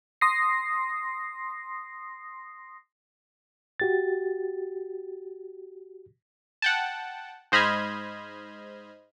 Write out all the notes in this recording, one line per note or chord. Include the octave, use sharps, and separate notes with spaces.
C6 D#6 A#6 C7
F#4 G4 A6
F#5 G5 A5
G#2 C5 D#5 B5 F6 G#6